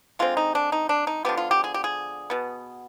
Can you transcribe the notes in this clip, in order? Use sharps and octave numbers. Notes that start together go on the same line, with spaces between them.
D3 G#3 C4 F4
D#4
D4
D#4
D4
D#4
D3 F3 B3 G4
F4
G4
G#4
G4
G#4
B2 B3